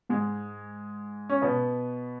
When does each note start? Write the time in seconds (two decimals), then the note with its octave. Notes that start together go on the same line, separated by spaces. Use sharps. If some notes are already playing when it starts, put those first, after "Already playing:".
0.09 G#2 G#3
1.29 C#4
1.42 B2 B3